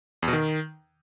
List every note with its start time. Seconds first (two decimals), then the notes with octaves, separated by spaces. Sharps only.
0.22 E2
0.28 B2
0.33 D#3